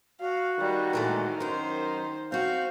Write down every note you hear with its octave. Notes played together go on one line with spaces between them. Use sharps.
F#4 F5
D#3 G3
A#2 E3 G#3 A3
F#2 A#4 C5
C4 F#4 F5 G6